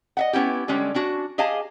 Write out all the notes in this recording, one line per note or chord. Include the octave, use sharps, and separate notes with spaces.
D#5 E5 F#5
B3 C#4 E4 G4
D3 G3 G#3 C#4
C#4 D4 F#4
G4 G#4 D#5 F5 G#5 A5